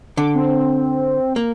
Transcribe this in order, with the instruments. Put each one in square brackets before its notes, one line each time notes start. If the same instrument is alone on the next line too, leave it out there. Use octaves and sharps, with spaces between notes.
[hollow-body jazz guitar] D3 [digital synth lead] D6
[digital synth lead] C4
[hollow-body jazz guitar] A#3